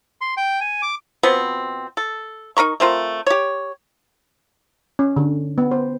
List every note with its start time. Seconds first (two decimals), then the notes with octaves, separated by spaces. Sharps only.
0.21 C6
0.37 G5
0.61 G#5
0.82 D6
1.23 B2 F3 B3 C4
1.97 A4
2.57 D#4 A#4 A#5 C#6
2.80 A3 C4 F4 A#4
3.27 G4 C#5
4.99 C#4
5.16 D3
5.58 B3
5.71 C5